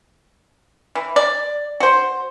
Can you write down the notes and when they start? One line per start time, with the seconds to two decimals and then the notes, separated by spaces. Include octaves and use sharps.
0.95 E3
1.16 D5
1.80 F#4 C5